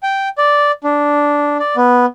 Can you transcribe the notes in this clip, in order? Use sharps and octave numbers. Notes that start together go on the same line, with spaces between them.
G5
D5
D4
D5
B3